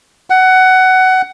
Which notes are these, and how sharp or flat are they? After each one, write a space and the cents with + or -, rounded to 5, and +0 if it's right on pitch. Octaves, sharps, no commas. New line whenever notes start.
F#5 +15